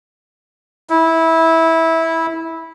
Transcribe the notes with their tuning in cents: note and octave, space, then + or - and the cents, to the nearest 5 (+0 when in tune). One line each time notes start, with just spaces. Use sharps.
E4 -15